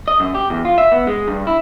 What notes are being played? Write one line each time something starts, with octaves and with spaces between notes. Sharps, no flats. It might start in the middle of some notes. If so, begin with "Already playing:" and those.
D#5
F#2
G4
E2
F4
E5
B3
G#3
G2
E4